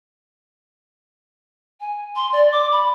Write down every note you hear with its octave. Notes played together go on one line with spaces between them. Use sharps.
G#5
C6
D5
D6
B5